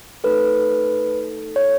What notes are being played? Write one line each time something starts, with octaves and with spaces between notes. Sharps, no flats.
A3 D#4 A4 B4
C#5